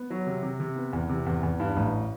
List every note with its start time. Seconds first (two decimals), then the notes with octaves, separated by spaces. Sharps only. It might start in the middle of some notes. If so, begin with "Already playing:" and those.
Already playing: B3
0.10 F#3
0.27 C3
0.43 C3
0.60 C3
0.76 B3
0.93 E2
1.09 C3
1.26 E2
1.43 E2
1.60 G2
1.76 A1